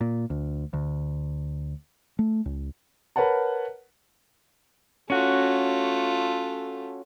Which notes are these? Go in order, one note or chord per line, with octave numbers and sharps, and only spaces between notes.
A#2
D2
D2
A3
C#2
A#4 B4 C#5 F#5 A5
A3 C#4 F4 F#4